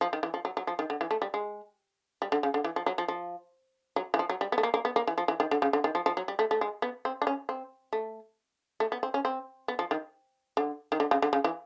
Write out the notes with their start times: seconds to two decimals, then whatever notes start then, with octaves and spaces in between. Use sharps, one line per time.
0.01 F3
0.13 D#3
0.23 E3
0.34 F3
0.45 F#3
0.57 F#3
0.67 F3
0.79 D#3
0.90 D3
1.01 E3
1.11 A3
1.22 G3
1.34 G#3
2.22 G3
2.32 D3
2.43 C#3
2.54 D3
2.64 E3
2.76 F3
2.86 F#3
2.98 F3
3.08 F3
3.96 F#3
4.14 E3
4.19 F3
4.29 F#3
4.41 G3
4.52 B3
4.58 A3
4.63 A#3
4.74 A#3
4.85 B3
4.96 A#3
5.07 E3
5.18 F3
5.28 E3
5.40 D#3
5.51 D3
5.62 C#3
5.73 D3
5.84 D#3
5.95 F3
6.06 F3
6.17 F#3
6.28 G3
6.39 A3
6.51 A3
6.61 G#3
6.82 B3
7.05 C4
7.22 D4
7.27 C#4
7.49 C4
7.93 A3
8.80 A3
8.92 B3
9.03 C4
9.14 C#4
9.25 C4
9.68 B3
9.79 F3
9.91 D#3
10.57 D3
10.92 D#3
11.00 D3
11.11 C#3
11.22 D3
11.33 C#3
11.44 E3